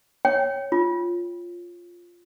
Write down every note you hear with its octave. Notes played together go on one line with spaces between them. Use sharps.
C#5 G5
F4